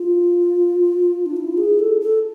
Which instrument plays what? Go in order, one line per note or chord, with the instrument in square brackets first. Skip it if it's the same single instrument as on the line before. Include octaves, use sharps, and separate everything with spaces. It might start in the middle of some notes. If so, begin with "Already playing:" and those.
Already playing: [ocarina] F4
D4
E4
F4
G#4
A4
A4